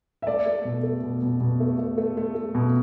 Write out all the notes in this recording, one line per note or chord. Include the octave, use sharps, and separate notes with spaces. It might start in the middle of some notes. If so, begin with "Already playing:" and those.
E5
A3 D5
A3
B2
A3
B2
B2
B2
A3
A3
A3
A3
A3
B2